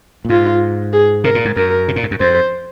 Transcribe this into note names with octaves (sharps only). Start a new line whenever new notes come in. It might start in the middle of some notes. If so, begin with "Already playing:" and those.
A#2
G#2 F4
G#4
C3 A#4
A#2
G#2
F#2 A#4
C3
A#2
G#2
F#2
F2 C5